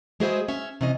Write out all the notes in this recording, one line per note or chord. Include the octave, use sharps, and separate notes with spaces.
G#3 F#4 G#4 B4 C5 E5
C#4 E5
C3 E3 C#4 D#5